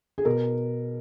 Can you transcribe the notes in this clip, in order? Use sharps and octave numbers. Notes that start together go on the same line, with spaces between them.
G#4
B2 A#4